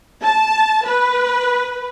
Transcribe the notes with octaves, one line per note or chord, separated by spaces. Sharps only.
A5
B4